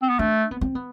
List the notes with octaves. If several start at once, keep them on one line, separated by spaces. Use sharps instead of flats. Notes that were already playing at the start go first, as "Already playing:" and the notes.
C4
B3
A3 D4
B3
C4
B3